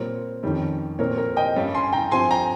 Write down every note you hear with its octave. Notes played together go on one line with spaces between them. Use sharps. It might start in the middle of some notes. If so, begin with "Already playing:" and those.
Already playing: A#2 G3 C4 A#4 C#5
F2 D#3 G3 C#4
A#2 F3 C4 A#4 C#5
A#4
D#5 G5
G2 G3 C#4
G#5 C6
G5 A#5
G2 F3 C4 G#5 C6
G5 A#5